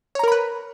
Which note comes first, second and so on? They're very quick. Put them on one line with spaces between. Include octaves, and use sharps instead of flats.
C#5 A#5 A#4 B5 B4